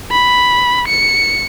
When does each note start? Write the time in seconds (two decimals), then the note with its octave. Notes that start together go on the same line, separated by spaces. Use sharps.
0.11 B5
0.88 C#7